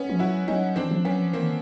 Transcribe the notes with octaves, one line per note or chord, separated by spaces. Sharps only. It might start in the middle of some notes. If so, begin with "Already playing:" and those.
Already playing: B3 C#4
F3
F#3 E4 F#4
F#3 C#4 D#4
E3 C4 D4
F3
F#3 B3 C#4
F3
E3 A#3 C4
D#3